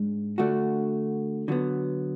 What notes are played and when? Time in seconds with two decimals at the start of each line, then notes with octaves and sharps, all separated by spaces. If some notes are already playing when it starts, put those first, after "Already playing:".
Already playing: G#2 G#3 D4
0.38 D3 A3 D4 F#4
1.48 D3 F#3 B3